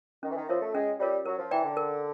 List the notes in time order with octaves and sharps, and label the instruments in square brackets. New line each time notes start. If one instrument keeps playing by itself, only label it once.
[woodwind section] D#3 [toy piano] C#4
[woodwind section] E3
D#3
[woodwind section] F3 [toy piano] F4 A#4 C#5 E5
[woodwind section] A3
[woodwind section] G#3 [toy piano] C#4
[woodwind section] G3 [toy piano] F4 A#4 C#5 E5
[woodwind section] F#3 [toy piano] A#4
[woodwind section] F3
[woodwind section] E3 [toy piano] D5 G5 A#5
[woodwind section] D3
[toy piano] A#4